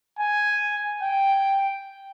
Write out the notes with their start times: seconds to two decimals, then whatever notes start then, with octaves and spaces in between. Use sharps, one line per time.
0.19 G#5
1.02 G5